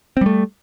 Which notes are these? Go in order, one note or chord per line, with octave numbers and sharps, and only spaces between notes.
G3 A3 C4